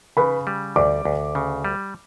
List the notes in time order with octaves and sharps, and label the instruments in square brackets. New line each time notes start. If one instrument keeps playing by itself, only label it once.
[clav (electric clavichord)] C#3 [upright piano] B4 B5
[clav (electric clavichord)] G3
[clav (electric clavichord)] D2 [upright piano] D5 D6
[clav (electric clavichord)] D2
C#3
G3